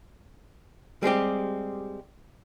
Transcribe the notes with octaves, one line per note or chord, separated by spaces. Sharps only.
G3 G#3 C4 G4